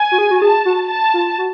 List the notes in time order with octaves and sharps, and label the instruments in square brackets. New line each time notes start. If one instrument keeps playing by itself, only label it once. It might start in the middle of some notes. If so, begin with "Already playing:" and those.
Already playing: [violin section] G#5
[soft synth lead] F#4
G#4
F#4
[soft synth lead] G#4 [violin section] A5
[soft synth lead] F#4
[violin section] A5
[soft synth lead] F4
F#4